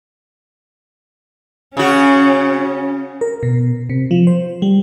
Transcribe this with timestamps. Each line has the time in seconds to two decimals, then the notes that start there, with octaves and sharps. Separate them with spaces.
1.77 C#3 C#4 F#4
3.21 A#4
3.43 B2
3.90 C3
4.11 F3
4.27 C5
4.62 G3